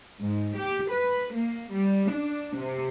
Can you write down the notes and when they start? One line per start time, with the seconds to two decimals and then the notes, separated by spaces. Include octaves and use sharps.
0.21 G#2
0.56 G4
0.91 B4
1.33 A#3
1.72 G3
2.12 D4
2.58 C3